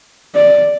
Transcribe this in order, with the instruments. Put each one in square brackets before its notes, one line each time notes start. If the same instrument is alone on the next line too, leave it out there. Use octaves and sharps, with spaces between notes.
[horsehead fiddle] D5